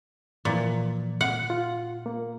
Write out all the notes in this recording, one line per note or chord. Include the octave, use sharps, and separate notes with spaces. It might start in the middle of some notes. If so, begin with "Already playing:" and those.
A#2 E3 F3 A#3
F#5
F4
A#3